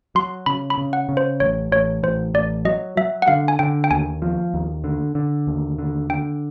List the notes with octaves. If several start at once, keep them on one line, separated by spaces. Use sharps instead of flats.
F#3 C6
C#3 B5
B5
C#3
F#5
C#3
C5
A1 C#5
A1 C#5
A1 C5
A1 D5
F#3 D#5
F#3 E5
F#5
D3 F5
G#5
D3 G5
G5
D#2 G#5
F3
D#2
D3
D3
D#2
D3
D3 G5